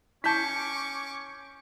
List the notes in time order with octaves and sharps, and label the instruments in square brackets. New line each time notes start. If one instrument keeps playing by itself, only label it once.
[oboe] C#4 [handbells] E4 A5 [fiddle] C#6 D6 [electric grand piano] G6 B6